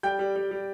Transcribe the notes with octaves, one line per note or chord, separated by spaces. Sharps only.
G3 G5 G6
G3
G3
G3